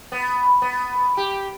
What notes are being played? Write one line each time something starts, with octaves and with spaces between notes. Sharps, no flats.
B3
B3
G4